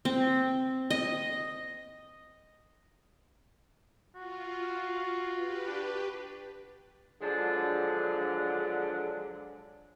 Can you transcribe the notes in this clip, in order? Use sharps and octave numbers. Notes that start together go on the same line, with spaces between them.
C4
D#5
F4 F#4
G4 B4
D4
D3 F3 F#3 G#3 D4